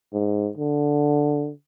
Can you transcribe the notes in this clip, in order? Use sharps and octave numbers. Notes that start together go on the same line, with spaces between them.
G#2
D3